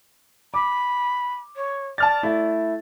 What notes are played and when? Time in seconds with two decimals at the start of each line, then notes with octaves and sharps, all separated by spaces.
0.54 B5 D6
1.56 C#5
1.98 D5 A5 F6 A6
2.23 A3 E4